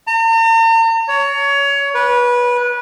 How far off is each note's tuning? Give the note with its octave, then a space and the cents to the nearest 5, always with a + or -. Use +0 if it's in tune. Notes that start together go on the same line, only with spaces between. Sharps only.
A#5 -45
C#5 +20
B4 -20